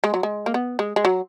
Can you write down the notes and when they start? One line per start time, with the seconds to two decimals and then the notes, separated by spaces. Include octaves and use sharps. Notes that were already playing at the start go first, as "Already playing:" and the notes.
0.04 G#3
0.14 F#3
0.23 G#3
0.46 A#3
0.54 B3
0.79 G#3
0.96 G#3
1.05 F#3